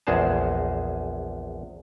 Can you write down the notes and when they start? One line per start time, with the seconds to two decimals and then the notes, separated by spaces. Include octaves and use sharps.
0.07 A#1 E2 G#3 G#4 C5 A5